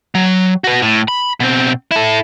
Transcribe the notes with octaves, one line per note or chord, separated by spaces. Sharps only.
F#3
F#4 B4
A2
B5
B2 C4
E4 A4